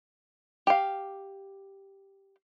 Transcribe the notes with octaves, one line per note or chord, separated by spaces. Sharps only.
G4 F5